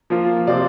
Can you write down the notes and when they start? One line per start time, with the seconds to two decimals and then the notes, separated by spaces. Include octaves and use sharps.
0.10 F3 A#3 F4
0.47 C3 F3 C4 F4 D5